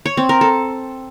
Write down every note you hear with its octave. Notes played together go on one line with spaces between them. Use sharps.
C#5
C4
A#4
A4